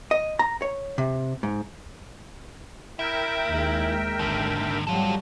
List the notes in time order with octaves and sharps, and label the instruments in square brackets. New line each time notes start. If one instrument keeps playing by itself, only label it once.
[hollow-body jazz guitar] D#5
A#5
C#5
C3
G#2
[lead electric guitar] E4 [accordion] A#4 E5 G5
[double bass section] D#2 G#3
[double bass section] G#1 [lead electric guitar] D#2 D3
[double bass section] F#3 G3 [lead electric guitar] F4 A4